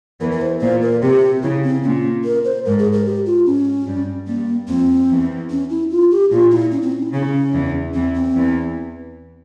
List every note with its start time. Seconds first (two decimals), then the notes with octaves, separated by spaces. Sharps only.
0.21 E2 E3 A#4
0.31 A#4
0.42 C5
0.61 A#2 C5
0.82 A#4
1.02 C3 G4
1.43 C#3 E4
1.63 C4
1.84 A#2 C#4
2.25 A#4
2.45 C5
2.65 G#2 A#4
2.79 G#4
2.92 A#4
3.06 G4
3.26 F4
3.46 G#2 C#4
3.87 G2 G3
4.27 G2 G3 A#3
4.68 F2 F3 C4
5.09 E2 E3
5.50 C#4
5.70 E4
5.91 F4
6.11 G4
6.31 A#2 F4
6.51 E4
6.72 C#4
6.82 C4
6.92 C#4
7.03 E4
7.13 C#3 C#4
7.53 E2 E3
7.94 E2 E3 C4
8.14 C4
8.35 E2 E3